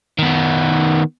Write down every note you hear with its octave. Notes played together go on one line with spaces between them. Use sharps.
D#3 B3